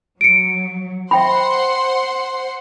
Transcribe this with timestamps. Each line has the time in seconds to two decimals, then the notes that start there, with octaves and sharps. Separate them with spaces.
0.21 F#3 C#7 D7
1.11 C5 E5 F#5 G5 B5 C6